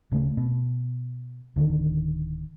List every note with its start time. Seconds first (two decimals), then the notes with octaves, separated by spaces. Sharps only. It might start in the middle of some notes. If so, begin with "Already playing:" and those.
0.11 D1 C#3 A3
0.37 B2
1.56 D1 D3 D#3